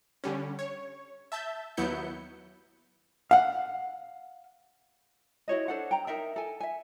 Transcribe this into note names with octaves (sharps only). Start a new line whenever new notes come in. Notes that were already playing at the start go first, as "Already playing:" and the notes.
D3 G3 C#4
C#5
E5 A5 G6
D#2 F#3 B3 E4 G6 C#7
F5 F#5
E4 F#4 C#5 D#5
D4 A4 C5 F#5
G5 A#5
D#4 A#4 E5 G5
A4 G#5
E5 G#5